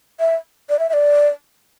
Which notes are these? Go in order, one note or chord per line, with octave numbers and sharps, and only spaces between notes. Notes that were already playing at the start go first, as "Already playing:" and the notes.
E5
D5
E5
E5
D5